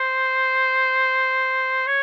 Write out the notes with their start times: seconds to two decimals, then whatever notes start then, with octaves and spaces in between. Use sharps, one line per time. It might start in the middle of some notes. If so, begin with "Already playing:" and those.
Already playing: C5
1.87 C#5